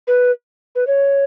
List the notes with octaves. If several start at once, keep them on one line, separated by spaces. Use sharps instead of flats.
B4
B4
C#5